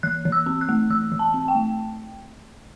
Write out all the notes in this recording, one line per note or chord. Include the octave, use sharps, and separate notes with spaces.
E3 F#6
E3
E6
C4
F#6
A3
E3 E6
E3
A5
C4
G5
A3